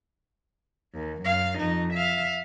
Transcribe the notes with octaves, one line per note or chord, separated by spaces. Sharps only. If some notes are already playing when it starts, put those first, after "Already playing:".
D#2
F#2 F5
F2 D#4
E5 F5